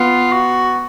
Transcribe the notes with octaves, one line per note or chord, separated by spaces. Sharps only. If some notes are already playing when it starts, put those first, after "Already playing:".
Already playing: B3 F4
F#4